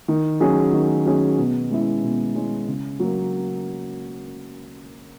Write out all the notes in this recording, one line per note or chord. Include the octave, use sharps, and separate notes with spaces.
D#3
F#3 C#4 G#4
D#3
F#3 C#4 G#4
B2
G#3 C#4 E4
B2
G#3 C#4 E4
C#3
F#3 A#3